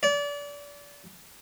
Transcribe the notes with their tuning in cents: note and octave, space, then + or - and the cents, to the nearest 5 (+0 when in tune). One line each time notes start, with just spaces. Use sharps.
D5 -30